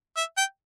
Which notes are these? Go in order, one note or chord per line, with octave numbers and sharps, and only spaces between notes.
E5
G5